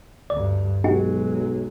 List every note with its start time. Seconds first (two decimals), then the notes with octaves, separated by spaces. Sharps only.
0.30 D2 G2 D5
0.84 B1 F#3 G#3 D#4 F#4 G4